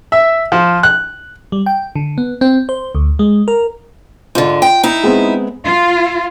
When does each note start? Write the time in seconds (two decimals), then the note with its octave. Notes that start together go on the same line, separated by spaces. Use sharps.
0.12 E5
0.52 F3
0.83 F#6
1.52 G3
1.66 G5
1.96 D3
2.18 B3
2.41 C4
2.69 C5
2.95 D2
3.19 G#3
3.48 A#4
4.35 G#2 D3 F4
4.62 G5
4.83 D#4 E4
5.04 G#3 B3 C4
5.65 F4